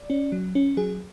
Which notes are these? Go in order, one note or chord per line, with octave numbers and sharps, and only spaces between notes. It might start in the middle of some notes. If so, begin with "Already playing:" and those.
Already playing: D5
C#4
F#3
C#4
F#3 G#4